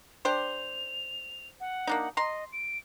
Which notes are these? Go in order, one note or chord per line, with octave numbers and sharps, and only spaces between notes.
D4 G4 C5 F7
F#5
A#3 D4 D#4
D#5 A#5 C6
D7